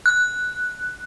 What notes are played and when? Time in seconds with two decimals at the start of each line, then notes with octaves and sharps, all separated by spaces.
0.06 F#6